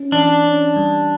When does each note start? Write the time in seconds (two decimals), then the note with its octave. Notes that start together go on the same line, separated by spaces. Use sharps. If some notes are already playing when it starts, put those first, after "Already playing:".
Already playing: C#4
0.12 E3 D4
0.45 C#4
0.76 G3